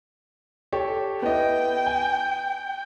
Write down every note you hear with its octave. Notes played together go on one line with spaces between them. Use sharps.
G4 A4 C#5
B3 E4 D#5 G5
G#5